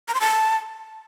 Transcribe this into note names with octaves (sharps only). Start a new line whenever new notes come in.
A#5
C6
A5